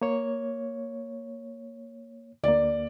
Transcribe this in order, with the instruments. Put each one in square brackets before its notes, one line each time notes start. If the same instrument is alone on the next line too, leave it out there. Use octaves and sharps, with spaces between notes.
[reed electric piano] A#3 C#5
[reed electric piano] D2 A#3 [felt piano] D5